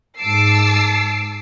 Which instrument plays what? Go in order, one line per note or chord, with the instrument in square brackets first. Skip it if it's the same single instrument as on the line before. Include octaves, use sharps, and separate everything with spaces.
[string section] G#2 A5 D6 E6 C7